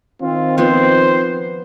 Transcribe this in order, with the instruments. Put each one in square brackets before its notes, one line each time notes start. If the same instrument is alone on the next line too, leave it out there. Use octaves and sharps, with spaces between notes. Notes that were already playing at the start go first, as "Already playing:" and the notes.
[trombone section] D#3 C4 [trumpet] F4
[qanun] F3 B3 [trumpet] C5